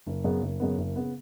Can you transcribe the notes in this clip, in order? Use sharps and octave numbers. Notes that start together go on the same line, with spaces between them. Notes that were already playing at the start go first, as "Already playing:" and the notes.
F#1
F#2 C#3 B3
F#1
F#2 C#3 B3
F#1
C#3 B3